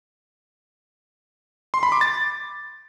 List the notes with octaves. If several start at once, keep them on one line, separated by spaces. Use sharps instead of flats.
C6
B5
D6
A6